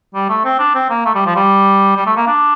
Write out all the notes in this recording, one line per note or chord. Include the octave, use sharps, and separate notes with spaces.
G3
A3
C4
D4
C4
A#3
A3
G3
F3
G3
G3
A3
A#3
D4